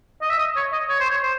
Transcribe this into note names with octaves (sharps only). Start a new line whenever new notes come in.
D#5
E5
D#5
C#5
D#5
C#5
C5
C#5
C5